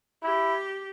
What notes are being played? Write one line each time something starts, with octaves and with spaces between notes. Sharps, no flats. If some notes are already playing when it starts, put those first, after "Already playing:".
E4 G4